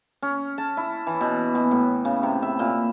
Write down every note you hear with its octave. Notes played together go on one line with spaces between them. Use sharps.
C#4
A5
E4
E3
B2
B2
A2
C#3
C3
E5
A#2